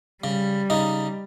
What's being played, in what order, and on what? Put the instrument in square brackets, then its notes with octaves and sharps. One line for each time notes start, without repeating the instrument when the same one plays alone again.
[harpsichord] C#3 [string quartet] G3
[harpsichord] C#3 D#4